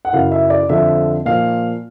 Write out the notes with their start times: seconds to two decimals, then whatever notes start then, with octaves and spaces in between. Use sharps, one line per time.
0.05 F#5
0.13 F#2 C#3 E3 F5
0.31 E5
0.50 D5
0.69 F2 D3 F3 E5
1.26 A#2 F3 F5